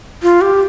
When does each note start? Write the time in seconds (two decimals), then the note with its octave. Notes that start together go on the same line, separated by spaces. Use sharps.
0.23 F4
0.41 G4